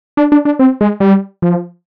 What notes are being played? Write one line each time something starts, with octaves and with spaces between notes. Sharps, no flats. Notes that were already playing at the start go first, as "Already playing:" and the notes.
D4
D4
D4
C4
G#3
G3
F3